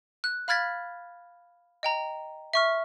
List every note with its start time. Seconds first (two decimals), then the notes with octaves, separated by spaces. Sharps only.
0.24 F#6
0.48 F5 B5 F6 G#6 A6 B6
1.83 D#5 G5 A#5
2.53 E5 C#6 F6